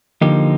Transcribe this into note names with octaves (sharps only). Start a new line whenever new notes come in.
D3 F3 A#3 D#4 G4